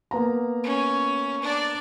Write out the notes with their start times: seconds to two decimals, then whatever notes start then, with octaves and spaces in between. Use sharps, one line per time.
0.11 A#3 B3 A#5
0.64 C#4
1.42 D4 D5